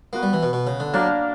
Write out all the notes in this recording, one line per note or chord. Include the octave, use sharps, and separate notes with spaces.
A#3 B3 F#4 B4
G3
E3
B2
B2
C#3
D3
F#3 A#3 D4 A#4